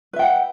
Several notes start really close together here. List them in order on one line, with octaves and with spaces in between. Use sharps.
B4 E5 G5 F#5